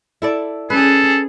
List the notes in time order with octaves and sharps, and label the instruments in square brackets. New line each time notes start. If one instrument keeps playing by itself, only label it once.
[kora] E4 A4 D5
[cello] C#4 G#4 [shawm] A4 [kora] B4